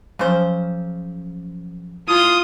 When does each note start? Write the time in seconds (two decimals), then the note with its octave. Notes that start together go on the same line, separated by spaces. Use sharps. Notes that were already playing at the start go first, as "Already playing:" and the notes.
0.19 C#3 F3 F#3 C#4 C5
2.08 E4 F4 A5 D#6